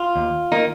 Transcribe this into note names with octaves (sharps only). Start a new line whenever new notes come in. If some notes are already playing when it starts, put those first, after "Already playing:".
Already playing: F4
D#2
D#3 A#3 D#4